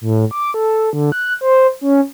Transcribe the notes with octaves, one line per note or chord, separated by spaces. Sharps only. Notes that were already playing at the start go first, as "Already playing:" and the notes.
A2
D6
A4
D3
F#6
C5
C#4